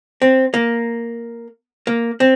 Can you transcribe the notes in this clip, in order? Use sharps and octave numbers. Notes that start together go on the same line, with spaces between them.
C4
A#3
A#3
C4